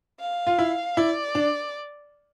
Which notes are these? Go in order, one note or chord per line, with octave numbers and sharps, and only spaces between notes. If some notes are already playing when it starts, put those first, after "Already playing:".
F5
F4
E4
E4 D5
D4